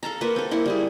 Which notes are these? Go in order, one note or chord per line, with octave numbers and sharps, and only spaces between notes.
A4 F5 A5 A#5
A#3 F4 B4 F#5
C4 A4
A#3 E4 F#5
G3 E4 G#4